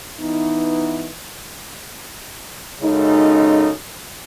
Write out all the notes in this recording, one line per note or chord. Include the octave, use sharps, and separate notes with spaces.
E3 B3 D#4
F#2 C#3 G#3 D#4 A4